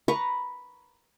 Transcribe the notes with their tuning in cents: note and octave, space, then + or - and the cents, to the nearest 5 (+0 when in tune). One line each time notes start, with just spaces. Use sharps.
B4 +0 A#5 +0 C#6 +0